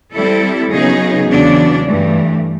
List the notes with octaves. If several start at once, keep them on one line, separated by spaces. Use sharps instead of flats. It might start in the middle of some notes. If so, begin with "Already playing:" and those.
G3 C4 E4 A4
C#3 F#3 B3 D#4 G#4
E2 C#3 F#3 B3 D4
G2 E3 A3